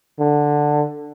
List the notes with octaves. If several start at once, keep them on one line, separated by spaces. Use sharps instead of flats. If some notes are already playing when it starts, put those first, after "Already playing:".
D3